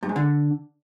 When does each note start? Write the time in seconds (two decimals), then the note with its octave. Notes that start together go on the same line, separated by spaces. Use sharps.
0.03 G2
0.09 G#2
0.16 D3